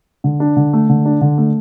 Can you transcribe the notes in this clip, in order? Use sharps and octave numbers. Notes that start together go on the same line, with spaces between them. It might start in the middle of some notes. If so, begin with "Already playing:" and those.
D3
D4
D3
A3
D3
D4
D3
A3